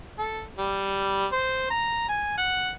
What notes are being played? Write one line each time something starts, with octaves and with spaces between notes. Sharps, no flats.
A4
G3
C5
A#5
G#5
F#5